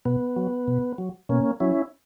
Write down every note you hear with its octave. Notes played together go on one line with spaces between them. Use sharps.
B2 B3
F#3
B2
F#3
B2 A#3 C#4
F#3 C#4 E4